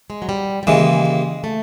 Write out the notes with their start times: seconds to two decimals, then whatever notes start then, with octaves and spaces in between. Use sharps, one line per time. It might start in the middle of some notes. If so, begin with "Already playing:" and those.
0.10 G#3
0.22 F#3
0.29 G3
0.63 G3
0.67 D#2 C#3 E3 G#3
1.05 G#3
1.44 A3